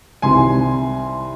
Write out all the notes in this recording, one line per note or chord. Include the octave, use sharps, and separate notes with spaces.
C2 C3 D#3 G3 G#5 C6